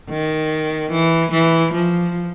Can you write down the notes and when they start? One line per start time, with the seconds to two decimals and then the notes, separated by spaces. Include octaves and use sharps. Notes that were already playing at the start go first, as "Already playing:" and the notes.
0.10 D#3
0.92 E3
1.32 E3
1.74 F3